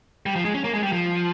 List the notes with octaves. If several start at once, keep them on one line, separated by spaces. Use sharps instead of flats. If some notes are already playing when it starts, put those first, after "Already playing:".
G3
F3
G#3
C#4
A#3
G#3
G3
F3